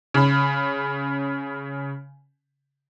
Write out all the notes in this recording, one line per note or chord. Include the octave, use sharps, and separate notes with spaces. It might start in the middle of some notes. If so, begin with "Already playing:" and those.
C#3 B5